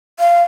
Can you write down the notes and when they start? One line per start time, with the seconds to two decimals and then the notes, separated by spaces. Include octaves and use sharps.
0.19 F5